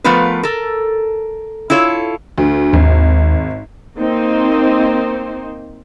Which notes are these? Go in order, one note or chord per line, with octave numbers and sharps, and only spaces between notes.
F3 A3 B3 F4 A#4 B4
A4 A#4
E4 F4 A4 C#5
D2
G#1 D#2
A#3 C4 D#4 C5